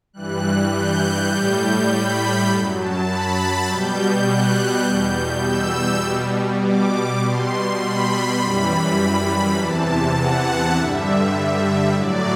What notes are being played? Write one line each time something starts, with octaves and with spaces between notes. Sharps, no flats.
G2 E3 G3 F#6
G6
A2 G3 G6
B5
F#2 F#3 A5
A5
B5
A6
B2 G3 G6
F#6
G6
E2 B2 G3 G6
E6
B2 G3
D6
B2 G3 C6
B5
F#2 E3 G3 B5
E2 C3 E3 A5
F#5
G2 D3 G3 E5
E5
A2 F#3 D5